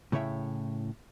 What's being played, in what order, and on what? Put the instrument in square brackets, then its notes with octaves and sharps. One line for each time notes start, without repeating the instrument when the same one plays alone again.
[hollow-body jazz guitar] A2 C#3 E4 C#5 E5 G5